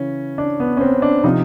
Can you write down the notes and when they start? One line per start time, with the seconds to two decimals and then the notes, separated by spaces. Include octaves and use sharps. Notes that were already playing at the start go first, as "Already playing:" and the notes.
Already playing: C#3 E3 C#4
0.38 D4
0.60 B3
0.77 C#4
0.81 C4
1.02 D4
1.24 C3 F3 D#4